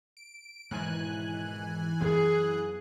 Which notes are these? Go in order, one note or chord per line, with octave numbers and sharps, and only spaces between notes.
D7
G#2 B2 D#3 E3 G#5 F#6
F#2 B3 G#4